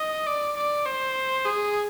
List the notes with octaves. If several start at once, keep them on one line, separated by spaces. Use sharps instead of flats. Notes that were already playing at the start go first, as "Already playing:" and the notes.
Already playing: D#5
D5
D5
C5
G#4